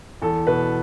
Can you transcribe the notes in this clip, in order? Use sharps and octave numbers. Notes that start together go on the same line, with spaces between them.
E2 A4
B2 B4